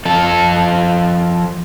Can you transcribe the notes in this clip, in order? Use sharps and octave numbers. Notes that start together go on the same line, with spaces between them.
F3 A4